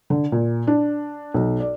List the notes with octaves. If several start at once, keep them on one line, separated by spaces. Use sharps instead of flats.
D3
A#2
D4
B1
D5